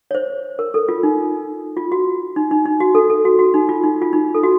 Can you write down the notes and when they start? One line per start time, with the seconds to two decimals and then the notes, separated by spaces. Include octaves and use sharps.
0.11 C#5
0.15 C5
0.59 A#4
0.74 A4
0.89 F4
1.03 D#4
1.77 F4
1.92 F#4
2.36 D#4
2.51 D#4
2.65 D#4
2.80 F#4
2.95 A4
3.10 A4
3.25 F#4
3.39 F#4
3.54 D#4
3.69 F4
3.84 D#4
4.02 F4
4.13 D#4
4.34 A4
4.43 F#4